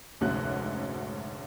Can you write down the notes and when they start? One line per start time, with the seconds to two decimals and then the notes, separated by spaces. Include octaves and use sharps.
0.21 F1 D2 G#2 C#4 F#4 F#6